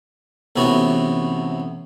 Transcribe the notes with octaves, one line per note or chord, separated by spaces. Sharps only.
A1 A2 C3 B3 F#4